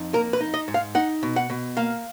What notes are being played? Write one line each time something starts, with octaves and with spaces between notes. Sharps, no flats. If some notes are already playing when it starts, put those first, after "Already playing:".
Already playing: F2 D#4
A#3 A#4
B4
D#4
D#5
G#2
F5
D#4 F#5
B2
F#5
B2
A#3 F5